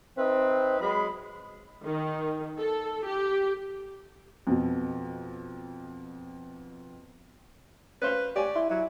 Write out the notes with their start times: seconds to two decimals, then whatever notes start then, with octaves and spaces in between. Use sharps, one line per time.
0.17 C4 D#4 B4 E5
0.80 F#3 G#3 B5
1.84 D#3
2.58 A4
3.06 G4
4.47 F2 B2
8.02 C#4 B4 C5 F5
8.36 G4 C#5 D5 G#5
8.55 E4 C6
8.70 F#3 E4